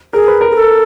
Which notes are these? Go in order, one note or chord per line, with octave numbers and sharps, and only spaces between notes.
G#4 A#4
B4
A#4
G#4
A4